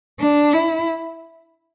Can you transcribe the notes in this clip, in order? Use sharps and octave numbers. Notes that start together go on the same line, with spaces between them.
D4
E4